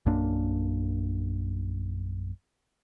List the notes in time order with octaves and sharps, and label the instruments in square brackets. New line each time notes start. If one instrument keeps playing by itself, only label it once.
[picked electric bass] A#1 F#2 A#3 D4